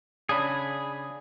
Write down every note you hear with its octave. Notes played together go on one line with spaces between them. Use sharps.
C#3 D4 G#4 B5